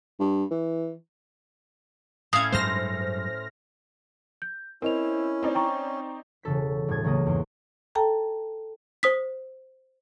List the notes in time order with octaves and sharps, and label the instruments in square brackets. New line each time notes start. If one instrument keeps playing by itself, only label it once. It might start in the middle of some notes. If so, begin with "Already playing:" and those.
[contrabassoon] G2
E3
[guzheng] A2 C#4 [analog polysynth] F5 G#6 [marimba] D#6
[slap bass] G2 F#3 G#3 [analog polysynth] C5 F6 A#6
[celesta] G6
[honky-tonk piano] C4 [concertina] C#4 [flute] E4 [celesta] A#4 D#5 F7
[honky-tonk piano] C4 D#4 D5
[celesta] G5 A#5 C#6
[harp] E1 C#3 A4 B6
E1 A2 G3 D#6 G#6 A6
C#2 C#3 F#3 A#3 D#6
E2 G#2 C6
[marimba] A4 G5 A5 A#5
[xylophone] C5 D#6 B6